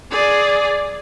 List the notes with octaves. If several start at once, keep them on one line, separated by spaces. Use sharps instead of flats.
G#4 D5